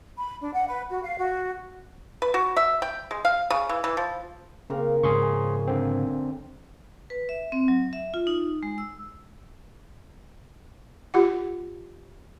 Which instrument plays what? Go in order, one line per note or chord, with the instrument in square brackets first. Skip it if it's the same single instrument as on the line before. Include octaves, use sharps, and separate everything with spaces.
[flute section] B5
D4
F#5
B4
F#4
F5
F#4
[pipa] B4
F#4
E5
G5
G#3
F5
C#3
E3
E3
F3
[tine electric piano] C#3 [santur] A#3 C4 A#4
[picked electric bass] G#2 C#3 [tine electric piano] G#4 C6 C#6
[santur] G#5
[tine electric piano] D3 C4
[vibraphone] B4
E5
C4
F#3
E5
F4
D#4
G#3
E6
[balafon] F4 G4 F#5